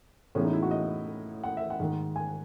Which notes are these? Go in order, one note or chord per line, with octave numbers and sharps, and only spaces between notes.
A2 E3 G#3 B3 C#4
D#4
E4
F#4
D#5
F#5
E5
F#5
G#2 D#3 G#3
G#5